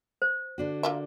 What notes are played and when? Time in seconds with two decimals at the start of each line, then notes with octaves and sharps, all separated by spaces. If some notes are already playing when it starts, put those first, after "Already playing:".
0.22 C5
0.58 D3 D4 F#4
0.83 A#3 F4 E5